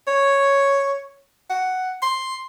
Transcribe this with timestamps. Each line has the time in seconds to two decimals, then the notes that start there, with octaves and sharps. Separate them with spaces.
0.07 C#5
1.50 F#5
2.02 C6